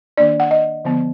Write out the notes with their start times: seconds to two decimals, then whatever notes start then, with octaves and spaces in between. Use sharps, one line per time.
0.17 D#3 A#3 D4 D5
0.40 F#5
0.51 D#5
0.85 D3 F3 B3